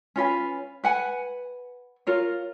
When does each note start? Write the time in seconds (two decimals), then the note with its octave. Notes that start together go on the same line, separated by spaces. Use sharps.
0.16 C#4 F4 B4 G#5
0.84 B4 F#5 G#5
2.07 F4 A#4 C#5